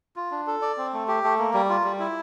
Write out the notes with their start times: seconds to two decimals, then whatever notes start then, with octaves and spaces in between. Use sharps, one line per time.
0.16 F4
0.31 D4
0.47 A4
0.62 D5
0.77 C4
0.93 A3
1.08 G4
1.24 A3
1.39 A#3
1.54 G3
1.70 F4
1.84 G3
2.00 E4